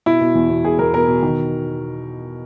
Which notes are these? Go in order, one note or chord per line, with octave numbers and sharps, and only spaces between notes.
B2 E4
B2
E2
B2
B2 G#4
E2 A#4
B2 A#4
B2
D#3